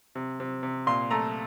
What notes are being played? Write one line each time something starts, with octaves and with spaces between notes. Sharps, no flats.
C3
C3
C3
A#2 C6
A3 A#5